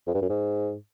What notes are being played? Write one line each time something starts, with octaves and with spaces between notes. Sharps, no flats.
F2
G2
F#2
G#2